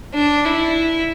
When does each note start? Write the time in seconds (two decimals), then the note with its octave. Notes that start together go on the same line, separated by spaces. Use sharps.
0.14 D4
0.45 E4